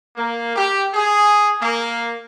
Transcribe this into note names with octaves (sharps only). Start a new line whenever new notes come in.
A#3
G4
G#4
A#3